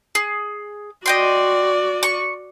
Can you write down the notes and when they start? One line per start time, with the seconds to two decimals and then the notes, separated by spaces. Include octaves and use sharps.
0.15 G#4
1.06 F#4 D5 D#5 G5 C6
2.03 C#6